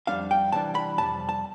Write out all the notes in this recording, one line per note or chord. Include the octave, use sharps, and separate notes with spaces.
F2 C3 G3 D4 F5
G5
C3 E3 G3 D4 A5
B5
F2 C3 G3 A5
A5